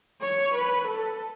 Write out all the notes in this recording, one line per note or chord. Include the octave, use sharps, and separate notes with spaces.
C#5
B4
A4